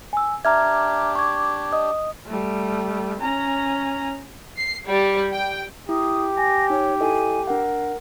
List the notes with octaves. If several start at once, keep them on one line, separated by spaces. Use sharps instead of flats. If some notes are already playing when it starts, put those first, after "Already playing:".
G#5 E6
D4 G4 E5 A#5 F6 G#6
C#6 D6 G#6
D#5 D#6
G3 A3
C#4 A#5
C7
G3
G5
E4 G4 D#6
G#5 A#6
D#4 C#5
E4 A4 D#5 G#5
D4 A#4 F#5